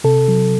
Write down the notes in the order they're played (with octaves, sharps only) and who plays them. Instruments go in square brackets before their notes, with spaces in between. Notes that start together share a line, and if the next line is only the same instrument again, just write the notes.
[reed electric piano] C3 A4
F#3